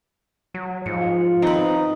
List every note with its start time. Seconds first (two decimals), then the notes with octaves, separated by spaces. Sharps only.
0.54 F#3
0.86 G#2 F3 C#7
1.42 C4 D#4 B4 F5 A#5